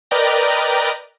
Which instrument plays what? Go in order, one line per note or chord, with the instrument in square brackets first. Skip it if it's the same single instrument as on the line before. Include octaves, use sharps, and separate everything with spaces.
[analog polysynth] A#4 B4 D5 D#5 G5 A#5